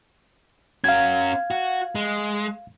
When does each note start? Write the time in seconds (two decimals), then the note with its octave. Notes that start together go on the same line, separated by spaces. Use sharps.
0.84 C#4 F#4 F5 G#6
1.51 F#4
1.95 G#3